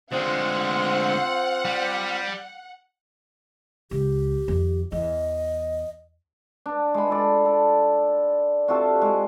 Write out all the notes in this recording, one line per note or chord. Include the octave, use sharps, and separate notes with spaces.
D2 G#3 C4 F4 C5 F#5
G3
C#2 G4
F2 D#3
E2 D#5
D4
G#3 B5
F4 A4 D5
A4
C3 F4 F#4 A4
G#3